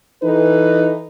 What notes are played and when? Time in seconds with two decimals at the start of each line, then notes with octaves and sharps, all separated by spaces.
0.23 E3 D#4 A4 B4